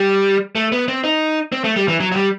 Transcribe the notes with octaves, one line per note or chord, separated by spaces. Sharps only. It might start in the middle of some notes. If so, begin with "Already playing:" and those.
Already playing: G3
A3
B3
C4
D#4
C4
A3
G3
E3
F#3
F#3
G3